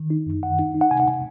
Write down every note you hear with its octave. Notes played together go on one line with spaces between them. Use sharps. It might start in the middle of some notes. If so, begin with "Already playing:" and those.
Already playing: D#3
D#4
F#2
D#3 F#5
D#4
D#4
F#5
C3 G#5
F#5
C3 G#5